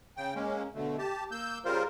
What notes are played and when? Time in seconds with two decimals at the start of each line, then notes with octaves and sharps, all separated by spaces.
0.17 C#3 G5
0.35 G#3 A#3 C#4
0.74 B2 D3 A3
0.99 G4 A5
1.31 A#3 E6 G6
1.65 C#3 G3 F4 A#4 C5